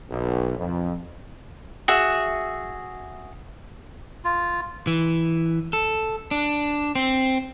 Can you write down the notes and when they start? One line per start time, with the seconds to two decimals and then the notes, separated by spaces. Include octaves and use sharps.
0.10 B1
0.59 F2
1.88 F#4 G#4 E5
4.24 F4
4.87 E3
5.73 A4
6.31 D4
6.95 C4